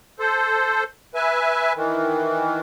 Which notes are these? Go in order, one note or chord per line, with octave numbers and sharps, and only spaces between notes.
A4 C5
B4 E5 G#5
D#3 E3